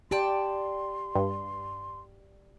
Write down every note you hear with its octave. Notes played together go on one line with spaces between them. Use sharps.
G4 D5 G5 A5 C6
G2